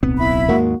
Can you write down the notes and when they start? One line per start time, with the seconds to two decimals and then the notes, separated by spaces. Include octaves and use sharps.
0.03 D1 B1 B3 C4
0.18 E4 B5
0.49 D#2 G#2 G#3 A#3 F#4